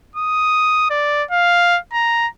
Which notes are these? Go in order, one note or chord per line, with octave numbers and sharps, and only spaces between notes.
D#6
D5
F5
A#5